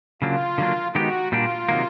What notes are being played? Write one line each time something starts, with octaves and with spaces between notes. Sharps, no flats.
C#3 F#3 A#3 D4 F4
D3 F#3 A#3 D4
D#3 G#3 B3 D#4 F#4 G4
A#2 G3 A#3 D4 F4
C3 D#3 F#3 A#3